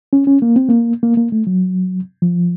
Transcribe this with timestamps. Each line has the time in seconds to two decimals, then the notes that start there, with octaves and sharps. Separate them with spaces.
0.13 C#4
0.27 C#4
0.42 A#3
0.56 C4
0.68 A#3
1.03 A#3
1.17 A#3
1.32 A3
1.47 F#3
2.22 F3